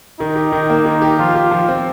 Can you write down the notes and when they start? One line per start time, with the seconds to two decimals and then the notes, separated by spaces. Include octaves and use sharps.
0.20 D#3 D#4
0.36 G4
0.52 D#3
0.70 A#3
0.86 D#3
1.02 G4
1.19 F3 F4
1.35 G4
1.51 F3
1.68 C4